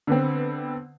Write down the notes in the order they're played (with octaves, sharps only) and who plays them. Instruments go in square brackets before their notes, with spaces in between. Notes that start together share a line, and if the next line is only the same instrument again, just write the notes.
[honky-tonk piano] D3 B3 C4